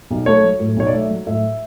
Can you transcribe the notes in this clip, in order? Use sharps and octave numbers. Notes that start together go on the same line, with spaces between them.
B1
A3 C#5
F#3
A2
B1 C#5
D5
A3 E5
F#3
A2 E5